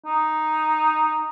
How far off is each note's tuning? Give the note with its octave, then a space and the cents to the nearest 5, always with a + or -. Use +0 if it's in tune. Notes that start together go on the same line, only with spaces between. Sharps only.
D#4 +0